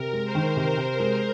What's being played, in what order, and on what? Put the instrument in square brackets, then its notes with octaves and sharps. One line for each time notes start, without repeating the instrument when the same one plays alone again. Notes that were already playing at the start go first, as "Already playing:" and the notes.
Already playing: [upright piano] C3 [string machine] A#4
[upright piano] G#3
[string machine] C5
[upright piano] D#3
[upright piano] C3 [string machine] A#4
[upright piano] C3
G#3